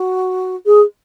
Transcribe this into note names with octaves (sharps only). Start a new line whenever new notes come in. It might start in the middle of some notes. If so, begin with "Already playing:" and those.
Already playing: F#4
G#4